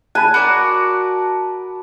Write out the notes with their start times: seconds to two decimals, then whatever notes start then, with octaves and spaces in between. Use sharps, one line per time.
0.15 G#5 A5 B5 F#6
0.34 F#4 A#4 D5